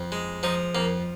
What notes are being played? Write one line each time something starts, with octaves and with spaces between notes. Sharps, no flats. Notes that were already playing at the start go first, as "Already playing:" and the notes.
Already playing: F2
G#3
F3 D#4
F2 A#3